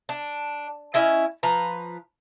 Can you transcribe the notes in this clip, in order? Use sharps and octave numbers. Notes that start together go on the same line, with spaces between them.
D4
C#4 E4 D#5
F3 B4 A#5